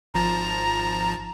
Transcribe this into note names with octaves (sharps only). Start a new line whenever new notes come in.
G#1 F3 A5 A#5